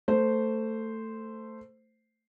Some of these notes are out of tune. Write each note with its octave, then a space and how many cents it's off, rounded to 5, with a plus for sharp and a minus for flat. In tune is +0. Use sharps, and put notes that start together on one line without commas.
A3 +15 C5 -5